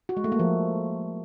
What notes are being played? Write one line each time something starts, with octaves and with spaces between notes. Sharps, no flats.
F#4
G#3
A3
A#3
F3